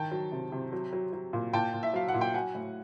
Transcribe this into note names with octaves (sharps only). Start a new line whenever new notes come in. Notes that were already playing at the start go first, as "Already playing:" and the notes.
Already playing: D#3 G5 A5
F#3
C3
C3
F#3
F#3
F#3
A#2
A#2 G5 A5
A#2
E5
F#3 F5
F#5
A#2
G5
F#3 F#5 G#5
A2